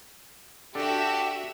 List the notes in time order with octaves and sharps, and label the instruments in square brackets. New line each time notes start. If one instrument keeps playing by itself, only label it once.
[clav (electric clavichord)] D4 A4 [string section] F#4 E5 [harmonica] G4